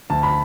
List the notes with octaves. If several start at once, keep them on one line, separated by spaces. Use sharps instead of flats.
D2 A5
B5